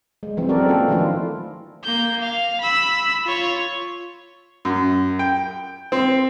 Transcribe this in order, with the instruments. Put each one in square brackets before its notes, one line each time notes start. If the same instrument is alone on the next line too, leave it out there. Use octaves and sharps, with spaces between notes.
[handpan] G#3
E3 F#3 G#3 C4
C4 C#4 F#4 A4 A#4 D5
A#3 F4 A4
D#3 F3 A3 D4 E4 F4
[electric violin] A#3 G6
F5
B5 E6
F4 C#5
[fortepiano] F#2
G5
C4